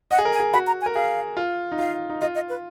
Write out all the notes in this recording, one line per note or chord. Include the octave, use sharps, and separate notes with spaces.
D#5 F#5
G#4
A#4
G#5
G#4
F#4 B5
A#5
G#5
A#4
G#4 F5
F4
D#4
F4 F5
D#4
F4 D#5
D#5
B4